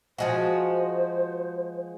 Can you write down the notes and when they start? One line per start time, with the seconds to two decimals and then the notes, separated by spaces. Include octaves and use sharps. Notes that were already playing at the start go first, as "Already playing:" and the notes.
0.18 F3 G#3 F#4 C5